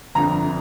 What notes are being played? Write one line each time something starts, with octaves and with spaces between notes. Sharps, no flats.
G1 F2 D3 A#5
D3